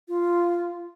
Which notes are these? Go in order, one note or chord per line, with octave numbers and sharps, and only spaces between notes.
F4